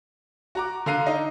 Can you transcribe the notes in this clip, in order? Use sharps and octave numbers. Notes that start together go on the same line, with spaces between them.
F#4 A#5 D6
D3 F5 A#5 C7 D#7
D#4